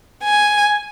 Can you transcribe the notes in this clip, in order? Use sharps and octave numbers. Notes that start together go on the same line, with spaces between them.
G#5